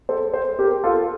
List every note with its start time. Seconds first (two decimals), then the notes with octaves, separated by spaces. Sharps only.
0.09 A4 C5
0.33 A4 C5
0.59 G4 A#4
0.84 F4 A4